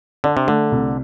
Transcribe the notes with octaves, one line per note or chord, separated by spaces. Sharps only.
D3 D4
C3
D3 A3
C2